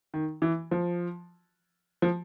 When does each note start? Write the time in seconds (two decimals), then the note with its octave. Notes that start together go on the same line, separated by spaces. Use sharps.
0.14 D#3
0.42 E3
0.71 F3
2.02 F3